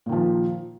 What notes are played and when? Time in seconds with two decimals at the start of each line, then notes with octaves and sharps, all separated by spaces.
0.06 A#2
0.09 D#3
0.12 F3